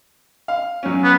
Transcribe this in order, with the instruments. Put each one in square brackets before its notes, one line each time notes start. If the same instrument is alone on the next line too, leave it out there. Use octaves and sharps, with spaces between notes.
[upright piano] F5
F#3 C#4
[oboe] B3